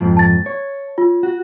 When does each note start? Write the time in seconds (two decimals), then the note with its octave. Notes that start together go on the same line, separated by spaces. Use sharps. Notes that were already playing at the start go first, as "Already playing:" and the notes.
0.01 F2 G#2 F3
0.17 A5 A6
0.46 C#5
0.98 F4
1.23 F#4